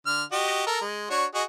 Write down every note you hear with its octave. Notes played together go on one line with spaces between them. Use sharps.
D3 F6
F#4 G4 D#5
A4 A#4
G#3
D4 F#4 C#5
F#4 G#4 D#5